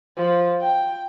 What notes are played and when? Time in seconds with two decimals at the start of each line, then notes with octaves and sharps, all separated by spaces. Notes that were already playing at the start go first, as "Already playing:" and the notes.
0.17 F3
0.62 G5